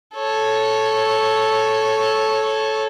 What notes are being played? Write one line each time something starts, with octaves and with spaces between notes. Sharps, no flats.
A4 C#5